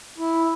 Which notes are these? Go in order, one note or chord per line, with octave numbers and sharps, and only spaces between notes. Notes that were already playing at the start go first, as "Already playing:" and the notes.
E4